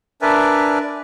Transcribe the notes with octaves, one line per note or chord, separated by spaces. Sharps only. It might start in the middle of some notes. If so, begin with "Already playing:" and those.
D4 A#4 B4 D5 E5 G#5